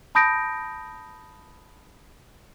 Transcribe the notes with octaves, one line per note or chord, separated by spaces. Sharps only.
A5 B5 D#6 G6 A#6 D7